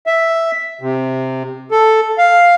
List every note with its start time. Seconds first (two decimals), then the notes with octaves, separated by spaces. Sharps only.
0.07 E5
0.81 C3
1.71 A4
2.18 F5